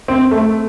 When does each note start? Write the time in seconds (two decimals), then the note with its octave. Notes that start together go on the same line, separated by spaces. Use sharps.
0.08 C4
0.31 A3